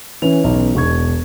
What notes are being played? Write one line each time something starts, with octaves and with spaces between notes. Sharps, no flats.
E3 C#4 F7
B1
E1 C#6 G#6